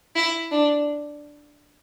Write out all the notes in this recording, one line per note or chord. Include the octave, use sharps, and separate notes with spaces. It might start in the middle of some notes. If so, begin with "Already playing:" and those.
E4
D4